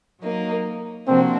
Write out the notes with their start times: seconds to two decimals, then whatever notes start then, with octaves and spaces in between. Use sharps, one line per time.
0.22 F#3 A#3 D#4
1.07 C3 F3 A#3 C4 D4 F#4